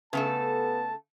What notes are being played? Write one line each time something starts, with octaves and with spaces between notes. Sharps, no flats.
C#3 A3 B3 A4 A5